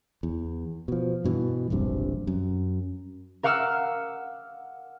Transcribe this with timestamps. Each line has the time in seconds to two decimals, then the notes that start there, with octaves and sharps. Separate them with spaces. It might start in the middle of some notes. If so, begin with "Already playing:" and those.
0.23 E2
0.88 B2 F3
1.24 G2 B2 D#3 E3
1.70 E1 A#1 G2 C3
2.27 F#2
3.43 A#4 F5 F#5 D6 E6 F6